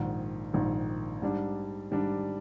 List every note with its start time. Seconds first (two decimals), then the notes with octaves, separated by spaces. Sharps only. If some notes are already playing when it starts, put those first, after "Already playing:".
Already playing: A#1 G#2 D#3
0.53 A#1 G#2 D#3
1.22 G#2 G3 D4
1.91 G#2 G3 D4